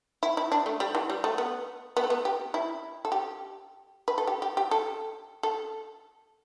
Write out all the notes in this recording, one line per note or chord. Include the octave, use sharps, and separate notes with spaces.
E4
E4
D4
A3
G3
E3
G3
A3
B3
B3
A3
B3
G4
E4
A4
G4
B4
A4
G4
G4
G4
A4
A4